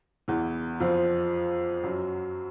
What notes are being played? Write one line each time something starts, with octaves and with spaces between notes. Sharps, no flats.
E2 E3
F2 F3
F#2 F#3